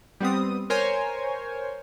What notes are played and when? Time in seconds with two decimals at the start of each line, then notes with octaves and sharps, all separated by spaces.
0.20 G3 B3 C4 D#6
0.70 A#4 C5 C#5 G#5